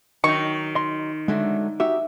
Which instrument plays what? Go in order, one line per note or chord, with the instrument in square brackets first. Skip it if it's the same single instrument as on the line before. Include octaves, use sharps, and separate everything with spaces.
[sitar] D#3 [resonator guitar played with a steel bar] F#3 D#4 [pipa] C#6
[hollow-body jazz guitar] D#5 C6
[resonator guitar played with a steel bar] D3 F#3 A3 [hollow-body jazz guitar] G#3
[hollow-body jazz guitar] D#4 F#4 G4 [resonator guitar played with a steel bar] E5